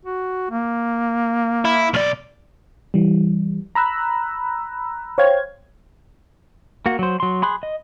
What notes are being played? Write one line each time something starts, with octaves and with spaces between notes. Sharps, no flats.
F#4
A#3
E4
B1 D5
E3 G3
A#5 B5 E6 F#6
C5 C#5 F5 G5 G#6
A#3 F#4
F#3 C5
F#3 C6
G#4 B5 C6 F#6
D#5